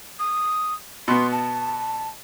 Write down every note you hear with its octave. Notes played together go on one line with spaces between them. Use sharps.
D#6
B2 B3 C6
A5